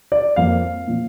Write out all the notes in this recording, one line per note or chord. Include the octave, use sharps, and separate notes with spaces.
D5
F2 F3 A#3 F5
A#2 F3